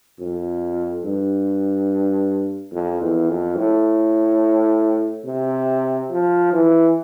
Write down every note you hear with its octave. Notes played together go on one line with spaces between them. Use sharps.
F2
G2
F2
E2
F2
A2
C3
F3
E3